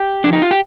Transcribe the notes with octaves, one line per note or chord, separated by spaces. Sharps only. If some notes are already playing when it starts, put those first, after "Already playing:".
Already playing: G4
F3 D4
D#4
F4
G4